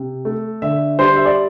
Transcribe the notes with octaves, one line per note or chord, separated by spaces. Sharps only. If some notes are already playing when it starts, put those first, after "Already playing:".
Already playing: C3
A3
D3 E5
G3 C5
E5
D5